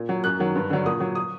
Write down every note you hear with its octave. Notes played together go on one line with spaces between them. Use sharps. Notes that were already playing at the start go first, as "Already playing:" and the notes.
Already playing: A#2
F#3
F#2 F#6
D#3 F#3
G2
D3 F#3
A#2 D#6
F#3
D#6